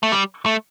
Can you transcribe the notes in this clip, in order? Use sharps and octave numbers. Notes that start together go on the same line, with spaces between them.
A3
G3
A3